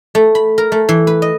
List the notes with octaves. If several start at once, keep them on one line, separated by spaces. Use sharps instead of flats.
A3
B5
A#4
A3
E3
B4
D#5